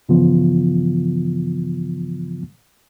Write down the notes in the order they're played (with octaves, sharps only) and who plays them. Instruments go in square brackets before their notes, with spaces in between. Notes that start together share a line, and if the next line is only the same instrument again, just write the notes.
[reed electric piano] G2 C#3 E3 F3 B3 F4